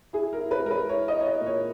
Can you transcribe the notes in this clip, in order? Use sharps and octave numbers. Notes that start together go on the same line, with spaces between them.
E4 G#4
A#4
E4
B4
G#3 A#4
B4
E4 C#5
D#5
E4
C#5
D#5
A#2
C#5